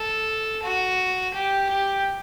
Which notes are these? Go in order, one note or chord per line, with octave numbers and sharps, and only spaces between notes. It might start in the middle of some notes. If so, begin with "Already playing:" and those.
Already playing: A4
F#4
G4
G4